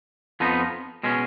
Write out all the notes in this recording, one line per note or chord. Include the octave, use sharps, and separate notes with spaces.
F2 F3 B3 D#4
B2 G#3 C#4